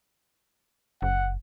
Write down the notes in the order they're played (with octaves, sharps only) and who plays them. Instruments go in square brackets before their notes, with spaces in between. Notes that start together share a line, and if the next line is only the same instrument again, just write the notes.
[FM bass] F#1 [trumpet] F#5